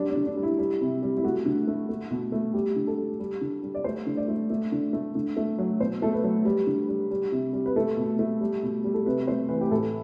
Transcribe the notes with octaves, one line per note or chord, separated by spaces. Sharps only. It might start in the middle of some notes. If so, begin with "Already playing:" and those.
Already playing: F#3 G3 D4
D4
D3
D4
G3
E4
G3
C3
G3
E4
A3 F#4
D3
A3
A3
B2
A3
G3 G4
D3
A4
G3
G3
D3
G3
D5
A3 C5
D3
D5
A3
A3
D3
A3
D3
A3
F#3
B2 C5
A3 A4
B4
F#3
G3
D3
G3
G3
C3
G3
B4
A3 A4
B2
A3
G3
B2
G3
A4
C3 B4
A3 C5
E3 B4
G4
A2 A4